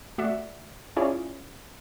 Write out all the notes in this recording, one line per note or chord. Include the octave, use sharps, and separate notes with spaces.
A3 F#4 D5 E5 F#5
C#4 E4 F4 G#4 C#5 D5